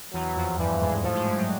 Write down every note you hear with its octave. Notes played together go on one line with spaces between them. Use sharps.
E2 E3 F#3
F2 F3
G2 E3 G3
G#2 G#3
A2 F3 A3
G#2 G#3
G2 G3
F#3